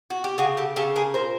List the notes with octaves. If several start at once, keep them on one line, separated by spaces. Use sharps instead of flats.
F#4
G4
C#3 F#4 G#4
G4 A4
C#3 G4 A4
G#4 A#4
A#2 A#4 C5